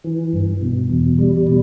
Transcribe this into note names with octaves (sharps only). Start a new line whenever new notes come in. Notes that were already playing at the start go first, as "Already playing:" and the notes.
E3
G2
B2
E2
G3
B2